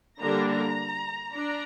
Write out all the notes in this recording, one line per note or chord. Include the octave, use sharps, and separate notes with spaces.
D3 G3 A#3 D4 A#5
A#5
D4 A#5